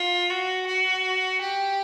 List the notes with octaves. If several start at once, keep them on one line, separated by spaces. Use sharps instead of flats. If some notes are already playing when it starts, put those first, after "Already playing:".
Already playing: F4
F#4
F#4
G4